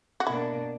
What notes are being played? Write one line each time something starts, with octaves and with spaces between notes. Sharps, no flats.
F#4
B2 A#3 D4 E4